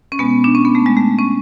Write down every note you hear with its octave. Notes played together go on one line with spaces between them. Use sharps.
C#4
B2 G#3 B3
D4
C#4
B3
A3
G#3
A3
C#4